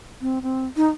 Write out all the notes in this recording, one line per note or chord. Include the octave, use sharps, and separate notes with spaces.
C4
C4
D#4